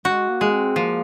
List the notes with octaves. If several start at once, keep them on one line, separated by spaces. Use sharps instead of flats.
G#3 F#4
A#3
G#3
C4
F3 A#3